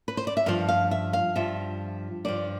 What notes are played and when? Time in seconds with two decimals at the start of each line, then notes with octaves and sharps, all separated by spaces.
0.08 B4
0.17 C5
0.27 D5
0.37 E5
0.46 G2 F3 F5
0.69 F5
0.91 E5
1.13 F5
1.36 G2 F3 E5
2.25 G2 F3 D5